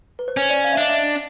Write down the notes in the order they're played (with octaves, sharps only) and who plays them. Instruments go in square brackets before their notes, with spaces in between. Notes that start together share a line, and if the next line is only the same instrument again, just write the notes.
[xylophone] B4
C5
[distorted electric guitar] C#4 [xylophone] C#5
[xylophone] D5
F5
E5
[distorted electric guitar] D4 [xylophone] D#5
[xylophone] E5